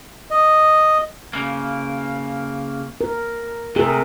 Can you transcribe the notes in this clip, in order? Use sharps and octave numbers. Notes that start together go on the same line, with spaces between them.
D#5
C#3 A#3
A#4
C3 A3 G#4 A#4